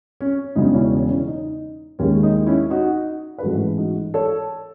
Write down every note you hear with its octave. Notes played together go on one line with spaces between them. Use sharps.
C#4
E1 E2 C#3 D#4
C#4 E4
C#4 E4
D#4
D#2 D#3 G#3 C#4
D#4
C#4 E4
D#4 F#4
B4
A1 G#2 E3 G#3 F#4 A4
D#4 F#4
A4 C#5